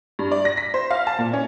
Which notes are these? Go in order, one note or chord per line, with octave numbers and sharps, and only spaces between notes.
G2
D5
A#6
B6
C5
F5
A5
A#2
C#4